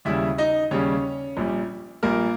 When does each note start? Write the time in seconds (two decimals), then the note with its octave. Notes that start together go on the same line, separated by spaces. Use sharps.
0.05 D#2 C#3 G3 E4 E5
0.38 D#4 D#5
0.71 D#2 C#3 G3 C#4 C#5
1.37 A#1 A#2 G3
2.03 A#1 A#2 G3 A#3 A#4